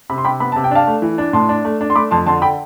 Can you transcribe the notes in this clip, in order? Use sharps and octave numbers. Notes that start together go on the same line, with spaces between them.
C3 B5
C6
C3 G5 B5
B3 B5
C3 A5
G5
D4 F5 A5
A3
E3
D4
A2 A5 C6
D4
A3
D4
C6
A3 B5 D6
F2 A5 C6
D3 A5 C6
D3 G5 B5